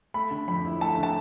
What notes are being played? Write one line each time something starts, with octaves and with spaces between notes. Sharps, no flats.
A3 B5
D3
F2 B5
E4
A3 A5
D3
A5